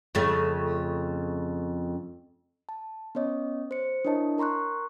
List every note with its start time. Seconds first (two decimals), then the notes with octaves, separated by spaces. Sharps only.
0.15 F2 C#3 A3
2.69 A5
3.15 B3 C#4 C#5 D#5
3.71 C5 C#7
4.05 D4 E4 A#4 C#5 D#5 A5
4.38 A#4 A#5 C6 C#6 F#6